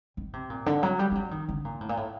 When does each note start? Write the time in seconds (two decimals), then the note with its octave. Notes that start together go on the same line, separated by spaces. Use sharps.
0.17 D#3
0.33 C3
0.50 A#2
0.66 D3
0.83 F#3
0.99 G3
1.11 G3
1.15 F#3
1.31 D#3
1.49 D3
1.65 A#2
1.81 A2
1.89 A#2
1.97 A2